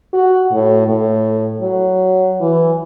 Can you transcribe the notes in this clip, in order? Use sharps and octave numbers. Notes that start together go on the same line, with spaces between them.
F#4
A2
A2
F#3
E3